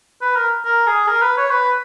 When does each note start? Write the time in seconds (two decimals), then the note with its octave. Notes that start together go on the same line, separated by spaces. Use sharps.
0.22 B4
0.36 A#4
0.65 A#4
0.87 G#4
1.08 A#4
1.22 B4
1.37 C#5
1.51 B4